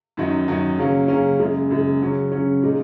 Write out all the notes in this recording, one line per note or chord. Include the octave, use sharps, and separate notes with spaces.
F#2 D#3 F#3 D#4
F#2 D#3 F#3 D#4
C#3 F#3 A#3 C#4
C#3 F#3 A#3 C#4
F#2 C#3 G#3
F#2 C#3 G#3
C#3 F#3 C#4
C#3 F#3 C#4
A#2 G#3 D#4